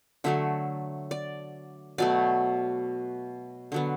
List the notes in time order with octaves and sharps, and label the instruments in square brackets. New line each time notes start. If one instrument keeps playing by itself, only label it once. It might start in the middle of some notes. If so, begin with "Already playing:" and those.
[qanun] D3 F#3 A3 E5
D5
B2 F#3 A3 D5
D3 F#3 B3